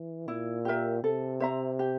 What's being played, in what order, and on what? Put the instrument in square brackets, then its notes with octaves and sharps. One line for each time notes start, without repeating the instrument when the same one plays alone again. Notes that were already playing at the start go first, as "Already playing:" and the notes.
Already playing: [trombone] E3
[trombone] A#2 [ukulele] E4
[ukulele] G4 A#4 E5
[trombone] C3 [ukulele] A4
[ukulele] C5 E5 A#5
G4